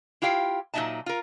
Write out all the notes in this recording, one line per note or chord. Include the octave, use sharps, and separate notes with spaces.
E4 F4 G4 F5 G5
A#2 F#3 C#4 D#4 E5 A5
F4 A#4